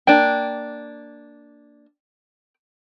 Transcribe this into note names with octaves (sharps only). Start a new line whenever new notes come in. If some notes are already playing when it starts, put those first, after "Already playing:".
A#3 D4 G5